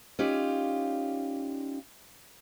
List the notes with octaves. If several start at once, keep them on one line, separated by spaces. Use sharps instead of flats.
C#4 D#4 F4 G4 D5